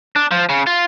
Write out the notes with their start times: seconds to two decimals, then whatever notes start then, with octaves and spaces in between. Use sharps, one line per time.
0.16 D4
0.31 F3
0.49 C#3
0.67 F4